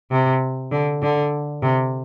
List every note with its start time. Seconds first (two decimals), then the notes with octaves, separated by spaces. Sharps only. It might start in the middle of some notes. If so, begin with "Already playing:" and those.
0.11 C3
0.72 D3
1.02 D3
1.63 C3